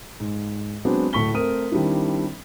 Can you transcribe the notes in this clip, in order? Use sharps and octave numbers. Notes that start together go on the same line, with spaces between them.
G#2
F#3 G#3 B3 C4 D4
D1 A2 A4 C#6 B6 G7
A3 C4 A#4 D#6 D#7
D#3 G3 C4 D4 E4